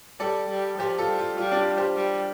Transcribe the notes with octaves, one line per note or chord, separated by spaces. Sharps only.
G3 A4 D5
G3
F3 G4 C5
F4 A4
G3
F4
G3 F4
D4
F4
G4 C5
G3